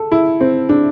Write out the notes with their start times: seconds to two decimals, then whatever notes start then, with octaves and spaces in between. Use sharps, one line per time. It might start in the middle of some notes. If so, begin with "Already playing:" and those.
Already playing: A4
0.12 E4
0.41 C4
0.69 D4